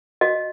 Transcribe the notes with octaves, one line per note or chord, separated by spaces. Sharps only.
F#4 D#5